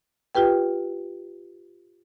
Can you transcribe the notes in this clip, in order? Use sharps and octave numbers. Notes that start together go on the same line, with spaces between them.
F4 G4 B4 G5